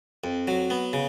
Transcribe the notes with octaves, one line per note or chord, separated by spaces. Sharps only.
F2
F#3
B3
C#3